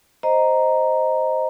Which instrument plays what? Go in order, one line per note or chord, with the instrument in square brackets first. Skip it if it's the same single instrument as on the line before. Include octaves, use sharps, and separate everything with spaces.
[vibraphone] C5 D#5 A#5